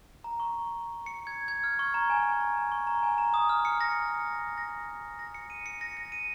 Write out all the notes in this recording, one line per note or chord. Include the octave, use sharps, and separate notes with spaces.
A#5
C#6
C#7
G#6
G#6
F6
C#6
A#5
G#5
A#5
C#6
A#5
G#5
A#5
D#6
F6
C#7
A#6
A#6
A#6
C#7
D#7
C#7
A#6
A#6
D#7